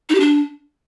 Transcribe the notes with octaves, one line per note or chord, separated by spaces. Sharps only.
D#4
G4
D4